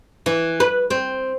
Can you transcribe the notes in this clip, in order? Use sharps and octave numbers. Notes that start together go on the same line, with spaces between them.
E3
B4
C4